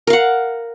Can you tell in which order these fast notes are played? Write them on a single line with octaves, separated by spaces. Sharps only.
A#4 F5 F#5